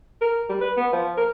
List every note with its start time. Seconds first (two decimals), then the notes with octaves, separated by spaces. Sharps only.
0.21 A#4
0.50 G3
0.61 B4
0.77 B3
0.93 F3
1.18 A#4